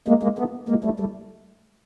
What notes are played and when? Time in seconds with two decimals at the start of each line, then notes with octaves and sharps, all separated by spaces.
0.08 G#3 A#3
0.23 G#3 A#3
0.38 A3 B3
0.69 G#3 A#3
0.84 G3 A3
1.00 G3 A3